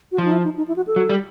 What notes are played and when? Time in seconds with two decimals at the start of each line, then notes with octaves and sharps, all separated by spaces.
0.12 F#4
0.18 F3 F4
0.25 D#4
0.32 E4
0.44 D#4
0.57 D#4
0.68 E4
0.76 F#4
0.87 A4
0.96 F#3
1.09 G3